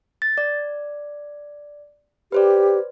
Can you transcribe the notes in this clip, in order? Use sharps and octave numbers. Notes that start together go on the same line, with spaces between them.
A6
D5
G4 B4 C5 D5